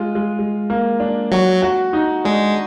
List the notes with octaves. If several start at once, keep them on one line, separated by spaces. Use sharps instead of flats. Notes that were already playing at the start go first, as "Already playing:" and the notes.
Already playing: G#3 F4
G#3
G#3
A#3
D4
F#3 F#4
F#4
D#4
G#3 D4